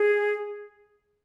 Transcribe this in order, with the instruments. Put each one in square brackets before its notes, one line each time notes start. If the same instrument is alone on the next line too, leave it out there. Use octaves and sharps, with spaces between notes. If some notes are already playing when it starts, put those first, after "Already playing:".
Already playing: [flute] G#4